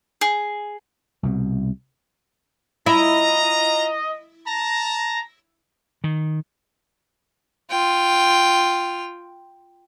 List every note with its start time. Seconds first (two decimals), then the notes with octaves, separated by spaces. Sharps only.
0.21 G#4
1.23 C2 B2
2.86 E4 F4 D#5 A#5
4.47 A5 A#5 A#6
6.04 D#3
7.71 F4 G5